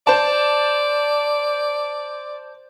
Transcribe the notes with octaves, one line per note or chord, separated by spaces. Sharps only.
C5 D5 A5